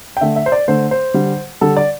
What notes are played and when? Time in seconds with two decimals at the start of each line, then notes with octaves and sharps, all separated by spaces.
0.17 G5
0.21 D3 A3 E5
0.36 E5
0.46 C5
0.52 D5
0.68 D3 A3 C5
0.91 C5
1.14 D3 G3
1.61 D3 G3 A4
1.77 D5